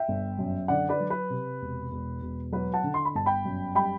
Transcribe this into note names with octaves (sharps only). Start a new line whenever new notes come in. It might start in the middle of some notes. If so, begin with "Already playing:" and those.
Already playing: E5 G5
G1
F#2
D3 D5 F#5
B4 D5
F#3
B4
C3
E1
E1
E1
F#3 B4
F#5 A5
D3
C6
B5
G1 A5
G5 B5
F#2
G3 G5 B5